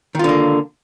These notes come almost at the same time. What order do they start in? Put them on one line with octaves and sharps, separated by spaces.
D#3 F4 D3 A#3